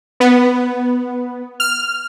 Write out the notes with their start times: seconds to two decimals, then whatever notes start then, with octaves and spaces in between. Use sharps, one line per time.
0.20 B3
1.60 F6